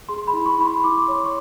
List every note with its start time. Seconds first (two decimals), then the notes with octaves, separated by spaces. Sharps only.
0.09 G#4 C6
0.27 B5
0.33 E4
0.46 C#6
0.58 E4 B5
0.66 C6
0.84 E4 D6
0.97 C#6
1.08 C#5 C6
1.25 C#6